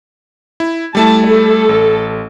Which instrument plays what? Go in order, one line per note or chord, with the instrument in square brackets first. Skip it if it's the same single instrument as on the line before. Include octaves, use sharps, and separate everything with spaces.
[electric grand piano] E4
[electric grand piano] G3 A3 E4 [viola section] A5
[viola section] A4
[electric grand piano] A1